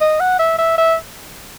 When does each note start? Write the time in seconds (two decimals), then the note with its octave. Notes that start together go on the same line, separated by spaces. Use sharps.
0.01 D#5
0.20 F#5
0.39 E5
0.58 E5
0.78 E5